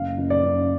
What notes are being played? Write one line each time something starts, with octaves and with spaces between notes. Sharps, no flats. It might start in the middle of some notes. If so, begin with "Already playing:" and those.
Already playing: F#1 F5
F#1
D5
F#1